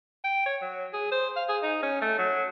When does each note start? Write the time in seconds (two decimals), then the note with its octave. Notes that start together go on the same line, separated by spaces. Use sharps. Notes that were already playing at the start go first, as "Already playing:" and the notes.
0.24 G5
0.46 C#5
0.62 F#3
0.93 G#4
1.12 C5
1.36 F5
1.49 G#4
1.63 D#4
1.83 C#4
2.01 A3
2.18 F#3